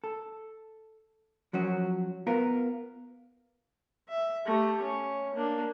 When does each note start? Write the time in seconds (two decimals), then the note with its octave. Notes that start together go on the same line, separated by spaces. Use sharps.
0.04 A4
1.53 F3 F#3 C#4 F#4
2.27 B3 F4 A#4
4.09 E5
4.46 A3 G4
4.83 C#4
5.35 A#3 D4